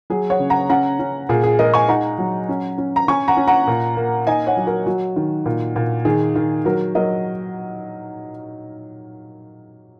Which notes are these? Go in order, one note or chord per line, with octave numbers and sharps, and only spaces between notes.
F#3 G#4
C#5 F#5
C#3
F#5 A#5
C#4 F#5 A#5
C#4
A#2 G#4
G#4
G#3 A#4 D#5
G#5 C#6
D#4 F#5 A#5
F#3
C#4
C#4
A#5
C#4 G#5 C#6
F#5 A#5
C#4
F#5 A#5
A#2
A#3
D#4 D#5 G#5
C#5 F#5
F#3
F#4 A#4
F#3 F#4
D#3
A#2
A#2
D#3 G#4
D#3
F#3 F#4 A#4
F#3 A#4 D#5